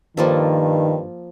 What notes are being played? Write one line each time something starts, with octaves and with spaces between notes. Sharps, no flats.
G2 D#3 F3 A#3 A4